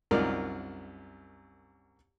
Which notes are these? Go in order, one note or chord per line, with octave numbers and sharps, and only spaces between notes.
C2 F#2 D#4 F4 A#4 D5